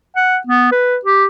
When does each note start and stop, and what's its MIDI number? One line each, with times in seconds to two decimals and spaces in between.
0.16 0.38 78
0.47 0.71 59
0.72 0.97 71
1.05 1.25 67